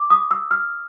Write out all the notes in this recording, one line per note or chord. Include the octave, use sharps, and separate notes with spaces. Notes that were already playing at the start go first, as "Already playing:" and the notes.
Already playing: D6
D#6
E6
F6